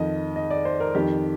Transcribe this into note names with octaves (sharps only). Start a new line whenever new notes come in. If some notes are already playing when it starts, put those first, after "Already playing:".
Already playing: F2 D#3 D#5
D#5
D5
C5
A#4
F2 D#3 G4